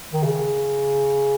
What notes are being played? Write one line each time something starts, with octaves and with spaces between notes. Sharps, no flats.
D#3
C#3